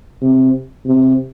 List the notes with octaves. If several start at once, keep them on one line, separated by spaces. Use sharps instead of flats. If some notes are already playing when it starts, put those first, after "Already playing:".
C3
C3